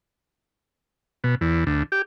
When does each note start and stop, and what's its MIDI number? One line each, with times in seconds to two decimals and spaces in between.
1.24 1.35 47
1.41 1.64 40
1.67 1.83 38
1.92 2.02 67